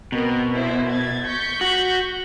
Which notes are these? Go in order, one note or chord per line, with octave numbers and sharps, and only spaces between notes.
B2 C4 A#4
B3 E4 C5
G#6 A6
C#6 G6 B6
F#4